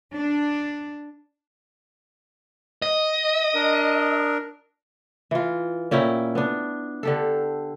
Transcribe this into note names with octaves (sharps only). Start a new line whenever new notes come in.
D4
D#5
D4 A#4
E3 F4
A#2 C#4 E4 G5
B3 D4
D3 G4 A4